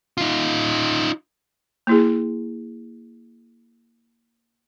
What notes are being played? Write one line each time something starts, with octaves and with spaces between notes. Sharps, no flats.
D#4 F4
A#3 E4 G#4